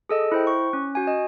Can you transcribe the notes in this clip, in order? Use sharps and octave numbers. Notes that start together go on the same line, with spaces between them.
G#4 A4 D#5
E4 C5 G5
C#6
C#4
F#4 G#5
D#5